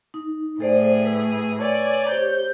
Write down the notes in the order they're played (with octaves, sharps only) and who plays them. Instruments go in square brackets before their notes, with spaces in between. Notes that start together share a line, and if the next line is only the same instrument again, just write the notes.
[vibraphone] D#4
[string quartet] A2 G#4 [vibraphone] A4 C5 D5
[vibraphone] B4 E6
[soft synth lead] C#5 [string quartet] D5 G#5
[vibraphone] G4 C5 [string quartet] G6